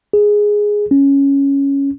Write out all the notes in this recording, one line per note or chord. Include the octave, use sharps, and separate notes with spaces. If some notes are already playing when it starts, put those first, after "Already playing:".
G#4
C#4